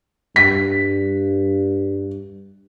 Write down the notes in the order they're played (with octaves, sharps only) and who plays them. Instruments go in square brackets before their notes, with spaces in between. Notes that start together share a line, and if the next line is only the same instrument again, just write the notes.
[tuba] G2 [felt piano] B6